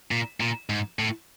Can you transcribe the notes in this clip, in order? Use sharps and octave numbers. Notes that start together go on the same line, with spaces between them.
A#2
A#2
G#2
A2